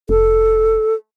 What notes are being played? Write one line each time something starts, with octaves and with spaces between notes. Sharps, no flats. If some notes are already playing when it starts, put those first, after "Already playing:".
F1 A4